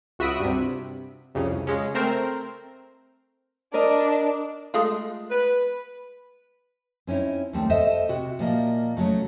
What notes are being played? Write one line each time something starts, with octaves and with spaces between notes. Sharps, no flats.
C#2 F#4 E5 B5 D#6 D7
G2 C3
C2 F2 C#3
C#3 G#3 C#4
A3 C4 A#4 C5
D4 A#4 D5 D#5
G#3 A3 F4
B4
C4 C#4 D#4 E4
D#2 G3 A3 C4
A4 C5 D#5 E5
C3 F#4
A#2 F3 A#3 A#4 D#5 E5
C#3 F#3 A3